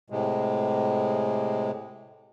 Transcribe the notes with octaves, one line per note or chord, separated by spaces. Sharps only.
A2 C3 G#3